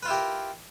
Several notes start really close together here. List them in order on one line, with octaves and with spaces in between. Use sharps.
B4 F4 E4 G4 A#4